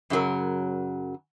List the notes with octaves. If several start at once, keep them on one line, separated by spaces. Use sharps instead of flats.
F#2 C#3 F#3 A#4